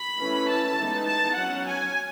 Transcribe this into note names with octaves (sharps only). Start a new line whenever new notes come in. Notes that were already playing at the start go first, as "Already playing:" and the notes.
Already playing: B5
E3 A3 C#4
A5
E3 G#3 B3 D#4
A5
F#3 C#4 F#5
G#5